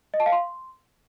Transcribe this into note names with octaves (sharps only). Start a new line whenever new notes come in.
D#5
A5
F5
C6